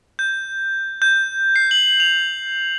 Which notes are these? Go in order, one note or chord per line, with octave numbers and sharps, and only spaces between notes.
G6
G6
C7
F#7
F7